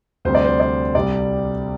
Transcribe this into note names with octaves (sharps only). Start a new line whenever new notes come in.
D2 C3 G3 C5
D5
C5
D5
C2 C3 G3 D5